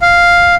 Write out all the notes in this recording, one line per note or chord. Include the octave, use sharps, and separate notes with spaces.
F5